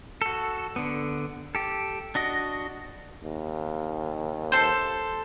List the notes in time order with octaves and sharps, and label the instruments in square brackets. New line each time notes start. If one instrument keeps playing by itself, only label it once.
[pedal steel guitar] F#4 A4
D3 B3
G4 A4
D4 F#4 D#5
[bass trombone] D#2
[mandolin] A4 C5